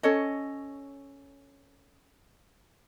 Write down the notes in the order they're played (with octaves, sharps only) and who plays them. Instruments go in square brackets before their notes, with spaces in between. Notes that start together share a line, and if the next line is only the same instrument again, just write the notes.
[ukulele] C#4 A4 C#5 D#5